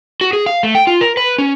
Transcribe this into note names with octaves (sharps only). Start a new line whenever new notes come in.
F#4
G#4
F5
A3
G5
F4
A#4
B4
C#4